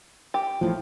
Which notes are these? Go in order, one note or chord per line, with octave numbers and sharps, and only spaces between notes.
G4
A1 A2 F3